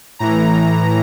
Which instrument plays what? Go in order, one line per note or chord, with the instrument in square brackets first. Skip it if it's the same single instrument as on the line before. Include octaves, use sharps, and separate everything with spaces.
[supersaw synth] A2 E3 A#5